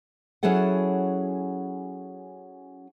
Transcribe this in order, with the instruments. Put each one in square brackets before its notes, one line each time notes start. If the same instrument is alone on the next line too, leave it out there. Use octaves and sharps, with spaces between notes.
[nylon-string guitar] F#3 C#4 E4 G#4 A4 F#5